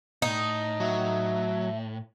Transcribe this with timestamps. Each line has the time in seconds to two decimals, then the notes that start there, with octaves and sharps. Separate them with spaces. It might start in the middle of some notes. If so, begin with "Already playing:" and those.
0.22 A2 D#4
0.80 F#3 E5